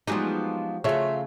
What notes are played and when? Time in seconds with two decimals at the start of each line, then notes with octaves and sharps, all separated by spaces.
0.07 F3 F#3 G#3 B3 D4 D#4 F4 G4
0.84 C#3 F#3 A3 F4 C#5 E5